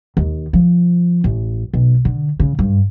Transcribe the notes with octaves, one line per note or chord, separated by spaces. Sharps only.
D#2
F3
A1
B1
D3
C#3
G2